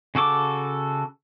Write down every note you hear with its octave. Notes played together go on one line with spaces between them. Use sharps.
C#3 F#4 A4 D6